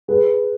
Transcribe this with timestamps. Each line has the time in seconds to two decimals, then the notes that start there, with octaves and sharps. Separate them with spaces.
0.08 G#4 B4